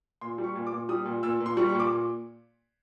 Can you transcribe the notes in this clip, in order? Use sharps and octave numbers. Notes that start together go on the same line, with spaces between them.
A#2 C6
G3
C#6
A#2
D6
A#2
G3 D#6
A#2
A#2 E6
A#2
C6
G3 C#6
A#2 C#6
D6
A#2